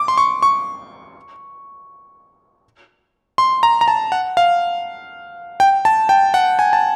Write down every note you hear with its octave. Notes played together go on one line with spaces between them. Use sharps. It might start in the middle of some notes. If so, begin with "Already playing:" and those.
Already playing: D6
C6
C#6
C#6
C6
A#5
A#5
A5
F#5
F5
G5
A5
G5
F#5
G#5
A5